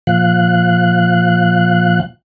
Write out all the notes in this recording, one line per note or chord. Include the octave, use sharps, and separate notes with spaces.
A#2 F3 F5 F#6